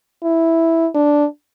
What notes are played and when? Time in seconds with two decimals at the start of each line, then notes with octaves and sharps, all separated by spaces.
0.24 E4
0.95 D4